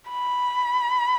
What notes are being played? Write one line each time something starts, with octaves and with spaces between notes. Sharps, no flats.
B5